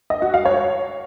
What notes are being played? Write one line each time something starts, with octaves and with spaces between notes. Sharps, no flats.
D#5
F#4
F5
C#5